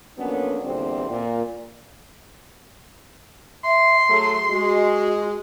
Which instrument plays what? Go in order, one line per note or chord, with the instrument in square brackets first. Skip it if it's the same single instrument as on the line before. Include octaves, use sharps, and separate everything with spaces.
[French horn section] F2 F#3 A#3 B3 C#4 D4
E2 A#2 D3 G3 C4
A#2
[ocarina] E5 [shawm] C6
[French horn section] F#3 A3 [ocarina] G#4
[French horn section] G#3 [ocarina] F#4